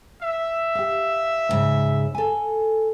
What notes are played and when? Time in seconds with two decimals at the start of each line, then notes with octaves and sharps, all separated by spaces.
0.23 E5
0.75 G4 F5
1.49 D2 G#2 C#3
2.15 A4 G#5